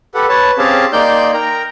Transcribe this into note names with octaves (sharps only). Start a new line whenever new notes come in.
G4 A4 B4 F#5
B4 C#5 A5
C4 C#4 G4 G#4 F5 A5
A#3 D#4 D5 G5 C6 G6
A#4 G5 A#5